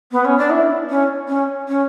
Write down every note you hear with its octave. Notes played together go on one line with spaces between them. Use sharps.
B3
C#4
D4
E4
C#4
C#4
C#4